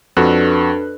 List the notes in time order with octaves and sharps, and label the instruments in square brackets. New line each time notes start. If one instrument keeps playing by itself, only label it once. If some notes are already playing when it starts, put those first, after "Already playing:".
[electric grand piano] F2 F#4 F#6 [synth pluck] D4 A4 B4